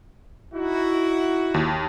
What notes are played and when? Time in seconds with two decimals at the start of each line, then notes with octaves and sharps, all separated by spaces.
0.54 D#4 E4 F#4
1.54 D#2